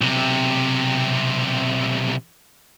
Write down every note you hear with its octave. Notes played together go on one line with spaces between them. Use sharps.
B1 C3